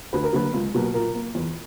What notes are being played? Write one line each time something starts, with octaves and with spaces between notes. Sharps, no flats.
D2 B4
A#4
D3 F#3 A#3 B4
C#2
B2 F#3 A#3
A#2 A#4
A#3
E2